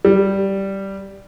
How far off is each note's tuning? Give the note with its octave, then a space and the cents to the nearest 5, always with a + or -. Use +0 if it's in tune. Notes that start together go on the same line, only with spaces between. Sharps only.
G3 -5